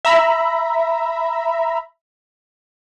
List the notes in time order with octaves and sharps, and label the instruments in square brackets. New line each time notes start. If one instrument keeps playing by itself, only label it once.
[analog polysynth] E5 A#5 B5